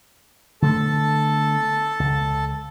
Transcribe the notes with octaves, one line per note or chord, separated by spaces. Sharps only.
D3 A3 B3 A4 A5
C#2